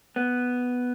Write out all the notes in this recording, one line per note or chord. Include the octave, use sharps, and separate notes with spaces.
B3